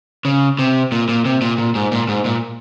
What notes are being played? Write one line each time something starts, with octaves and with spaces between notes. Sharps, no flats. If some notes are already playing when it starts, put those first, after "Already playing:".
C#3
C3
A#2
A#2
C3
A#2
A#2
G#2
A#2
G#2
A#2